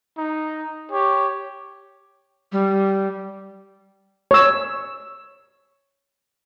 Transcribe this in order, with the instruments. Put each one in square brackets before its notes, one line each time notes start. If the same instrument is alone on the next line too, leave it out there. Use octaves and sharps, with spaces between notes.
[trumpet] D#4
[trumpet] G4 [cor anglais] C#5
[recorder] G3
[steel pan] C#5 E6